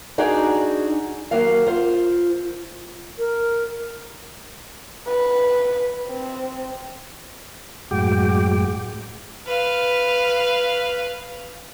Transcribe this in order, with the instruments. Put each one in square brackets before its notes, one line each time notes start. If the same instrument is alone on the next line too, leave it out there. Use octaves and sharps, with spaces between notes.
[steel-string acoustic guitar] D4 D#4 F#4 G#4 D5
D#2 F#3 A#3 F5
F4 C5
[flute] A#4
[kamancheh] B4
C4
[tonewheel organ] F#2 A2 G#3 F#4 G5 D6
[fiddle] B4 F5